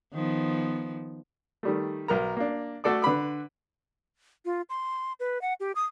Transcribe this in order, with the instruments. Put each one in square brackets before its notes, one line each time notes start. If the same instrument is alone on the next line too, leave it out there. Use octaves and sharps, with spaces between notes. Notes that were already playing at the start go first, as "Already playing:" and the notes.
[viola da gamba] D#3 F3 B3
[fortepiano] D#3 G3 A3
B1 A#4 A#5
A#3 D4
A3 F#4 A4 D5 D6
D3 B4 B5 D6
[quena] F4
C6
B4
F#5
G4
D#6